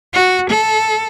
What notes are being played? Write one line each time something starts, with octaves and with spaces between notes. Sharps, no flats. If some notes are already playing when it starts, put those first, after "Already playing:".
F#4
A4